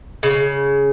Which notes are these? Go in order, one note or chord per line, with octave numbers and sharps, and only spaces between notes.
C#3